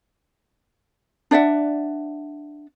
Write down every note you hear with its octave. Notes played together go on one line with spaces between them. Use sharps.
D4 D5 E5 F#5